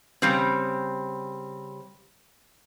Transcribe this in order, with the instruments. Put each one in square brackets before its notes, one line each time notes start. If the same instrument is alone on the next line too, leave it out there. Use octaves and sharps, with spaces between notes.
[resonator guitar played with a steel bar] C#3 G3 C4